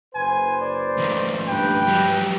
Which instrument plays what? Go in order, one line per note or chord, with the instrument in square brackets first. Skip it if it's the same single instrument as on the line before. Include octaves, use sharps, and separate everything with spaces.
[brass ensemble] F#1 B4 C5 [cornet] G#5
[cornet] D5
[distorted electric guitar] C#2 D#3
[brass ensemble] G2 B4 [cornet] G5
[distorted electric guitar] F#3 G3